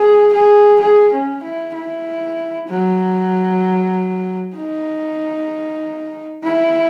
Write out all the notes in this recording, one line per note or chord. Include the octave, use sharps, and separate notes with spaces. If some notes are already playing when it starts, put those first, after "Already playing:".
Already playing: G#4
G#4
G#4
C#4
E4
E4
F#3
D#4
E4